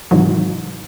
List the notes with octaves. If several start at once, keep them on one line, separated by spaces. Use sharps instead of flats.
G#2 C3 D#3 E3 F#3